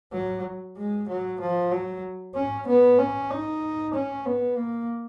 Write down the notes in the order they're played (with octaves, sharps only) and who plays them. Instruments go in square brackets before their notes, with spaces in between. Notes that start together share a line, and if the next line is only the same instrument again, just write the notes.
[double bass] F#3
G#3
F#3
F3
F#3
C#4
B3
C#4
D#4
C#4
B3
A#3